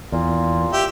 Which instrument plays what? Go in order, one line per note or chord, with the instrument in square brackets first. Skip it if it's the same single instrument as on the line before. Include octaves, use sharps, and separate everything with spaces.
[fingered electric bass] E2 [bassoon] A#2
[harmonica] G4 E5